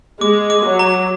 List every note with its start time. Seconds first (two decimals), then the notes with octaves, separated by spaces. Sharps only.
0.21 G#3 D6
0.50 D6
0.65 F#3
0.79 A#5